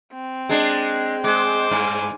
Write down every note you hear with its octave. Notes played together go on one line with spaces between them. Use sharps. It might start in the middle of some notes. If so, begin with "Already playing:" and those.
C4
G#3 D4
G#3 C5 D6
G2 G#5